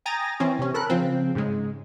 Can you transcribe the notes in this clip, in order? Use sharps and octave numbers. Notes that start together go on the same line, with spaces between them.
G5 G#5 A#5 D#6 A6 A#6
E3 C4 C#4
C3 C#4
A4 A#4 B5 F#6
C#3 F3 C4
G#2 C#3 G#3